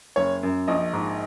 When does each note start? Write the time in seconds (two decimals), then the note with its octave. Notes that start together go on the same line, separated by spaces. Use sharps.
0.16 F#1 C#5
0.43 F#2
0.68 A#1 D#5
0.93 G#2